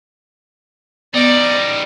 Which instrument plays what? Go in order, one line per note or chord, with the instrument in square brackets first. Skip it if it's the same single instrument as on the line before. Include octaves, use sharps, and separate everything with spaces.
[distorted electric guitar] G3 D#4 [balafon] B3 [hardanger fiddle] D5